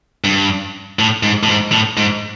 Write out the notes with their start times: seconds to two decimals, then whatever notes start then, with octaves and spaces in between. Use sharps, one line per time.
0.24 G2
0.99 A2
1.23 G#2
1.43 A2
1.48 G#2
1.72 A2
1.97 G#2